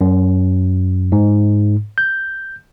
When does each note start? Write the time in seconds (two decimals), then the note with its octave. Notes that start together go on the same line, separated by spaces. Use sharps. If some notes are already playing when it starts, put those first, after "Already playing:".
0.01 F#2
1.12 G#2
1.98 G6